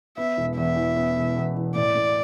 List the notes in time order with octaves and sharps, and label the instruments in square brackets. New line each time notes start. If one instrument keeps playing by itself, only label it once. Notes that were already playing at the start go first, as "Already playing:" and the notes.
[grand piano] B3 [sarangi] E5
[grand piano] E1
[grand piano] E2 [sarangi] E5
[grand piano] E3
B3
E1
E2
E3
[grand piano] A2 [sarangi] D5
[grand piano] A2